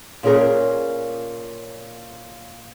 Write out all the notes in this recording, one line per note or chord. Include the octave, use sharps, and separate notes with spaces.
A#2 C#4 G#4 A#4